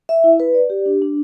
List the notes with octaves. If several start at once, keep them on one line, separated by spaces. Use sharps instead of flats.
E5
E4
B4
D5
G4
D4
D4